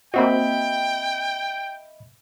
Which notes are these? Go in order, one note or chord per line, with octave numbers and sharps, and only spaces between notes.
A#3 C4 F#4 D#5 E5 G5 B5